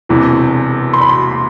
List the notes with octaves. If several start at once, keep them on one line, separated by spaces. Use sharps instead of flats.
E1 E2 C3 E3
C6
B5
C6